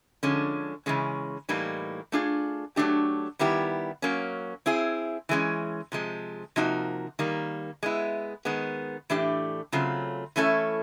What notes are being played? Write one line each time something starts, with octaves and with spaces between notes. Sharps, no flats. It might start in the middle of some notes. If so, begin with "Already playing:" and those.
D3 F3 G#3 C#4
C#3 E3 G#3 C#4
A2 E3 G3 A#3 D#4
A3 D4 F4 G#4
F#3 A3 D4 G4
D#3 G3 B3 E4 G4
F#3 A#3 C#4
C4 E4 G#4
E3 G#3 C#4
C3 F3 G#3
C3 F3 A#3 D#4 F#4
D#3 G3 A#3
G#3 B3 E4
D#3 G#3 B3
A2 E3 A3 D4 G4
C#3 F#3 A3 C4 F4
E3 A3 C#4 E4 A4